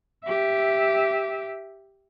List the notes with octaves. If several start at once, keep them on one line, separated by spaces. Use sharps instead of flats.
G4 E5